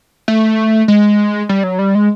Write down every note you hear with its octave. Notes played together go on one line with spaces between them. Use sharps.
A3
G#3
G3
F#3
G3
G#3